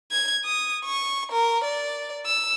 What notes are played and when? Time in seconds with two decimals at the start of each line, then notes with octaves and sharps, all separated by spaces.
0.11 G#6
0.44 D#6
0.85 C#6
1.32 A#4
1.64 D5
2.26 E6